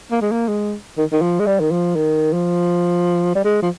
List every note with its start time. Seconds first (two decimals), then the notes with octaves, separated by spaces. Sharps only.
0.11 A#3
0.21 G#3
0.32 A#3
0.48 G#3
0.97 D#3
1.12 D#3
1.22 F3
1.40 G#3
1.47 G3
1.61 D#3
1.72 F3
1.96 D#3
2.33 F3
3.35 G3
3.44 G#3
3.62 F3